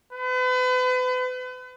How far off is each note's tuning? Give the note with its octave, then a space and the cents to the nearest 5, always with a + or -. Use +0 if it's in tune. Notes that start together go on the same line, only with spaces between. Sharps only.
B4 +40